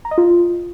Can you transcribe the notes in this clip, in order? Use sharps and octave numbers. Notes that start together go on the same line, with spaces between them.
A#5
D#5
F4